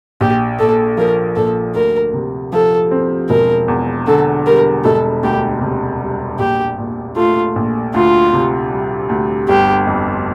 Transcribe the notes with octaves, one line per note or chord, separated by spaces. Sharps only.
A#1 G4
A#2 A4
F3 A#4
A#1 A4
D2 A#4
C3
F3 A4
C4
E1 A#4
E2
D3 A4
G3 A#4
E1 A4
D2 G4
C3
G3
A#1 G4
A#2
A3 F4
A#1
D2 F4
C3
G3
D2
G1 G4
F2